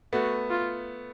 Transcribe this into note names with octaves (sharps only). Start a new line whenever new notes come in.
A3 B3 F#4
F4